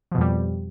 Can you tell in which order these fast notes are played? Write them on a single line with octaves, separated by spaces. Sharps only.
F3 B2 F2 G3